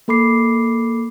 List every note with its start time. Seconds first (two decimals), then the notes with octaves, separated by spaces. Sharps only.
0.08 A#3 A4 B5 D6 C7